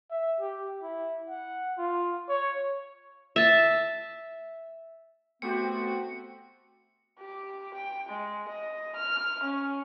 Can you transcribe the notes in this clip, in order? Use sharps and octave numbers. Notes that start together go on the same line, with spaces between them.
E5
G4
E4
F#5
F4
C#5
E5 A5
A3 B3 C4 F#4 G4 C5 C#7
G4
G5
G#3
D#5
F6
C#4